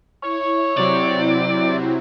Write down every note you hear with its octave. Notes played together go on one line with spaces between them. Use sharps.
E4 C#5
C3 F#3 C4 D5